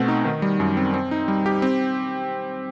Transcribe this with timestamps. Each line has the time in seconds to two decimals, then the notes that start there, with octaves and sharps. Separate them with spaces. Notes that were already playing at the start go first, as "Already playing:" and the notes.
Already playing: B2 A3 C4 F#4
0.08 D#4
0.25 D#3
0.42 G3
0.60 F#2
0.77 C4
0.94 C4
1.11 D#4
1.28 G3
1.46 G4
1.62 C4